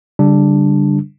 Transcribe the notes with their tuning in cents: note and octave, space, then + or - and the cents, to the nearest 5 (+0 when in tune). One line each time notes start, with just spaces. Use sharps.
D3 -45 G3 +0 D4 +0